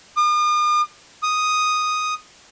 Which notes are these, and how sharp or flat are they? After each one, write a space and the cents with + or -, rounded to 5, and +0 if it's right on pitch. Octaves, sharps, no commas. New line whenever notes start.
D#6 -45
D#6 +0